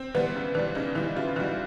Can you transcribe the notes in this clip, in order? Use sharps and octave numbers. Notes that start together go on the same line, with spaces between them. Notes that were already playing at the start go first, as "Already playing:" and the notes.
Already playing: C4
E3 G3 B3
C#3
E3 G3 D4
C#3 D#4
E3 G3 E4
C#3 F4
E3 G3 F#4